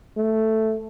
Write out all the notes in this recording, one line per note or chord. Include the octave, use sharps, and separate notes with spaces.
A3